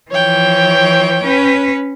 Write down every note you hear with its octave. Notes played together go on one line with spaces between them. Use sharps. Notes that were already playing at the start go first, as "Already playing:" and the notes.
E3 F3 C#5 G5
C#4 B4